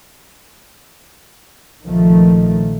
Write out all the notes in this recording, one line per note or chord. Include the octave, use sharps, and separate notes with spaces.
A#1 D#3 F3 A3